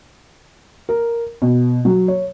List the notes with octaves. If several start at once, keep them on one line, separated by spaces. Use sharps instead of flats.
A#4
B2
F#3
C#5